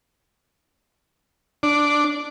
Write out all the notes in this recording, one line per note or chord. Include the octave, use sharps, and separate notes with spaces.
D4